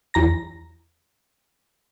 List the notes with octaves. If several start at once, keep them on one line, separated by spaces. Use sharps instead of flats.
E2 A#5 A#6